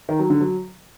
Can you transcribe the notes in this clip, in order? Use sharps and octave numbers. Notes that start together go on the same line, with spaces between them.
D#3
F#3
D3
F#3